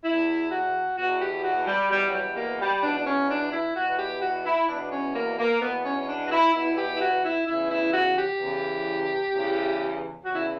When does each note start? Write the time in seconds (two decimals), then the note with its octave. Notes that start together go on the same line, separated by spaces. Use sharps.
0.04 E2 B2 E4
0.51 F#4
0.97 E2 B2 F#4
1.20 G4
1.44 F#4
1.67 G3
1.90 E2 B2 G3
2.09 F#3
2.14 G3
2.36 A#3
2.60 G3
2.83 E2 B2 D4
2.97 D4
3.06 C#4
3.29 D4
3.52 E4
3.76 E2 B2 F#4
3.99 G4
4.22 F#4
4.46 E4
4.68 E2 B2 D4
4.91 C#4
5.15 A#3
5.38 A#3
5.61 E2 B2 B3
5.84 C#4
6.01 C#4
6.07 D4
6.26 F#4
6.31 E4
6.53 E2 B2 E4
6.77 G4
6.96 E4
7.01 F#4
7.23 E4
7.47 E2 C#3 E3 E4
7.69 E4
7.93 F#4
8.16 G4
8.39 E2 C#3 E3
9.32 E2 C#3 E3
10.24 E2 C#3 E3 F#4
10.35 E4